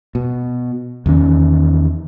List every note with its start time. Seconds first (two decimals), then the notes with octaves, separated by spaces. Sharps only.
0.15 B2
1.06 E2 D#3 C#4